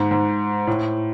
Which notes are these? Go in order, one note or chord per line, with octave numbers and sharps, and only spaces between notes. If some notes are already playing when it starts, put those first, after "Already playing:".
Already playing: G#2
G#2
A2